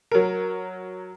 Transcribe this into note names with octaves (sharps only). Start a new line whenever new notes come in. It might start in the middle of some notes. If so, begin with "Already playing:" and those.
F#3 A#4